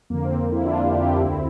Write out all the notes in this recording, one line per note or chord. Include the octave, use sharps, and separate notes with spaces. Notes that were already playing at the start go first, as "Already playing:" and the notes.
F2 D3 A#3
C4
C4 E4
D4 F4
E4 G4
E4 G4
D2 D3 C4 E4